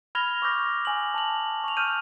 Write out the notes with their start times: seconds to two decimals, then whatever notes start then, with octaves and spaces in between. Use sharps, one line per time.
0.15 B5 F6 G#6 A#6 F7 G7
0.42 C#6 D6 E6 F6 G6 A#6
0.85 G#5 F#7
1.14 A5 F7 F#7
1.64 C#6 F7
1.77 E6 F6 G6 D#7